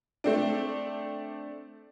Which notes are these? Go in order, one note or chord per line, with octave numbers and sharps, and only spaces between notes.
A3 C4 D4